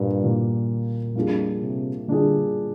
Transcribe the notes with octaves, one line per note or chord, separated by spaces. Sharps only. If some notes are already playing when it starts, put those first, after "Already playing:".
Already playing: G2 A#2 A#3
A#2 G3 A#3
F2 G3 A#3 D4 F4 G#4
C3
D3 G3 A#3 D4 F4 G#4